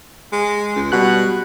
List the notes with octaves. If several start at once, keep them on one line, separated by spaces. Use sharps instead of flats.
G#3
C#2
B2 G3 F#4 F#6